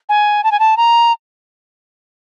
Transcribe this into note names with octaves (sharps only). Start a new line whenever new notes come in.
G#5
A5
G#5
A5
A#5